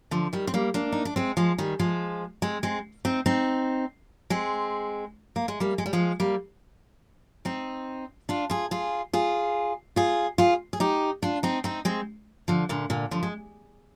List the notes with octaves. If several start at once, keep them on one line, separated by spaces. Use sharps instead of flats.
D3 F3
D#3 G3
C4
G3 A#3
A#3 D4
D#4
D4
G#3 C4
F3 G#3
D#3 G3
F3 G#3
G#3 C4
G#3 C4
C4 D#4
C4 D#4
G#3 C4
A#3
G#3
G3 A#3
G#3
G3
F3 G#3
G3 A#3
C4 D#4
D4 F4
F4 G#4
F4 G#4
F4 G#4
F4 G#4
F4 G#4
G#4
D#4 G4
D4 F4
C4 D#4
C4 D#4
G#3 C4
D3 F3
A#2 D3
A#2 D3
D3 F3
G#3